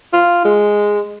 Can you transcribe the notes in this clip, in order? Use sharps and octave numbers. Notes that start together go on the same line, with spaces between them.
F4
G#3